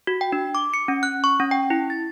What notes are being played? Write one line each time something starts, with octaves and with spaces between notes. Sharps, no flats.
F#4
G5
D4
D6
C#7
C#4
F#6
C#6
C#4
G5
E4
A6